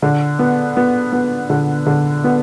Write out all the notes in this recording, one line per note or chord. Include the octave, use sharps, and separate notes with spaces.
D3
B3
B3
B3
D3
D3
B3